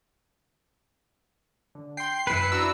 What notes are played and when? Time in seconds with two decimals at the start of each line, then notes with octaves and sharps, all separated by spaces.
1.75 D3
1.97 G5 C6 C7
2.27 F#2 E4 B4 E6 C#7
2.52 D4 F#4 A#5 E6